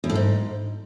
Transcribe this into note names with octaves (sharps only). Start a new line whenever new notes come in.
E2
A2
G#2